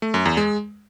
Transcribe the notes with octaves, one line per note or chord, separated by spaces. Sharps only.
A3
F#2
E2
G#3